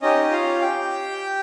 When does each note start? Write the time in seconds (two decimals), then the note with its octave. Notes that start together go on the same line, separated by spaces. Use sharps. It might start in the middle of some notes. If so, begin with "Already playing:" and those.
0.02 C#4 D#4 G4 D#5
0.31 F4 F5
0.61 G4 G5